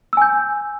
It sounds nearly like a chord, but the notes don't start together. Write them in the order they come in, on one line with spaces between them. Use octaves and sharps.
E6 G#5 G6